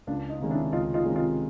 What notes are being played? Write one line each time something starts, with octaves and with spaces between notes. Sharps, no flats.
C#2 D4
D#4
C3 D#3 G#3 C#4
D4 E4
C#2 D#4 F4
D#4 F4
C3 D#3 G#3 C#4
D#4 F4